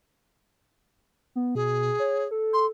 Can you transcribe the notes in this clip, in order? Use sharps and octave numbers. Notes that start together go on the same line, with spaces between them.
B3
B2 G#4
C#5
A4
C6